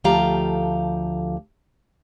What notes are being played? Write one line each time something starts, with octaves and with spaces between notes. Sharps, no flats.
D2 F3 A3 G4 F5 A#5